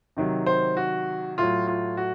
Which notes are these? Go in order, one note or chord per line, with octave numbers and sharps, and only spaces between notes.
C3 D#3 F#3
C5
F#4
A2 F#3 F4
F4
F#4